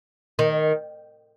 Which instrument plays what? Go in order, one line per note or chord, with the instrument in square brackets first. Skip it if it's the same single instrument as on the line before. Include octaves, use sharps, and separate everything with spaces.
[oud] D#3